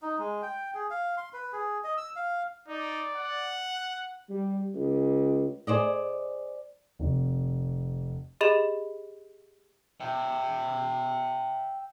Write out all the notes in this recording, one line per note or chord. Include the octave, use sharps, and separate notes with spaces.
D#4
G#3
G5
G#4
F5
C6
B4
G#4
D#5
E6
F5
D#4 D5
F#5
G3
C#2
G#4 C5 D5 D#5
F1
G4 G#4 D#5 B5 E7 F7
E5 G5